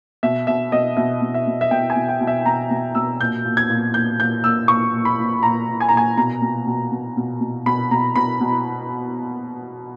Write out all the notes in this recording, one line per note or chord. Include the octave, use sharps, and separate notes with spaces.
B2 E5
B2 E5
B2 D#5
B2 E5
B2
E5
B2
E5
B2 G5
G#5
B2
G5
B2
E5
B2 A#5
B2
B2 E6
A#2 G6
A#2
G#6
A#2
A#2 G6
A#2 G6
A#2 E6
A#2 C#6
A#2
B5
A#2
A#2 A#5
A#2
G#5
A#5
A#2 G#5
B2 A#5
B2
B2
B2
B2
B2
B2 B5
B2 A#5
B2 B5
B2